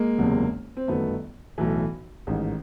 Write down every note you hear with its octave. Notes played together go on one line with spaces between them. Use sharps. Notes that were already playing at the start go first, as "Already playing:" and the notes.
Already playing: G#3 A#3
F#1 E2 C3
C4
G1 F#2 D#3 A3 B3
B1 A2 E3
A1 G#2 D#3